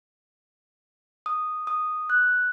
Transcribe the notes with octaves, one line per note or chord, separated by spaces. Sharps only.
D#6
D#6
F#6